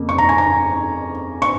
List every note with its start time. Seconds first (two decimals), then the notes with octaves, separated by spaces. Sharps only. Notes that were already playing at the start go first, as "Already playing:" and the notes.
Already playing: F2 C#3 A#3
0.09 C#6
0.18 A#5
0.29 G#5
0.38 A#5
1.42 C#6